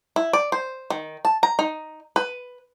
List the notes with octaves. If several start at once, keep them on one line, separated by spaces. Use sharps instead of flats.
E4
D5
C5
D#3
A5
A#5
D#4
B4